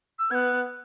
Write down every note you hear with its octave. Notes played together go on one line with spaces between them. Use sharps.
E6
B3 F#6 G#6